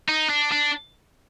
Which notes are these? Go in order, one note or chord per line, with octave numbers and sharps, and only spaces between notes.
D#4
D4
D4